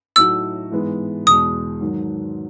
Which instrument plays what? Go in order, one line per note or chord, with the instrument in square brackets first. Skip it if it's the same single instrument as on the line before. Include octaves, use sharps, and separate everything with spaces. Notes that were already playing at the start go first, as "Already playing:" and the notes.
[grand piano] A2 F#3 A3 D#4 F#4 [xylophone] E6
[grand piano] G#2 E3 G#3 B3
[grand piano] E2 B2 G#3 [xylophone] D#6
[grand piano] G#2 D#3 F#3